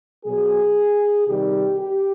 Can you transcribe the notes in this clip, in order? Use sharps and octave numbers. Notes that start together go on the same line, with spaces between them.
B2 F#3 G#4
C3 D#3 G3 G4
G4